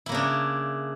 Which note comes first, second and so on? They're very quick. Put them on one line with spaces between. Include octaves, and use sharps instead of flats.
E4 A#3 C#3 D4